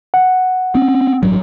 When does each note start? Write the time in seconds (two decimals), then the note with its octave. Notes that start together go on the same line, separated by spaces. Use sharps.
0.14 F#5
0.75 C4 C#4
1.23 A1 G2 F#3